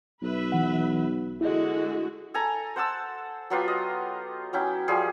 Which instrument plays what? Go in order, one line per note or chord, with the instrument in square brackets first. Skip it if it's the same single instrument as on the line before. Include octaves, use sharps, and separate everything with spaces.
[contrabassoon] B1 [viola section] B4 E5
[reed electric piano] E3 F#5
[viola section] D3 G#3 F#4 [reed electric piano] E4 D#5
[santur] A4 G#5 A#5
C5 F#5 A5 E6
F#3 B3 F4 G4
D#5
F#3 C#4 E4 G5
F3 G3 G#4